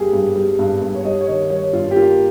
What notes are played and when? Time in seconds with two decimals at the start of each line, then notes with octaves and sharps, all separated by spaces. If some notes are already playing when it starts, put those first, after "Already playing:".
Already playing: G2 G3 A#3 G4 G#4
0.13 G2
0.36 G3
0.59 G2
0.81 G2
0.94 C#5
1.04 G3 D#5
1.21 C#5
1.27 D#3 D#5
1.50 G3 C#5
1.73 G2 F4
1.91 G4
1.96 A#3 F4